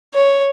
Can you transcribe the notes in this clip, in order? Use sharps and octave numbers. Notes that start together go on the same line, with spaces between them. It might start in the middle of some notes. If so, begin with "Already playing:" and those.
C#5